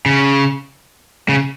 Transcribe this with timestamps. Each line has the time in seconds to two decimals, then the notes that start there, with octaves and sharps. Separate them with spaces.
0.06 C#3
1.29 C#3